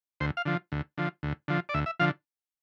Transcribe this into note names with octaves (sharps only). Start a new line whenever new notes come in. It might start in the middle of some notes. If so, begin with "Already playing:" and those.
D2 C5
F5
D3 F3
D2
D3 F3
D2
D3 F3
D5
D2 E5
E5
D3 F3 F5